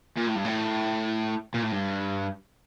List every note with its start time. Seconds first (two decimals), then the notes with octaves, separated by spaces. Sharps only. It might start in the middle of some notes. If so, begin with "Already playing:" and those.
0.17 A#2
0.27 A2
0.35 G2
0.44 A2
1.54 A#2
1.63 A2
1.72 G2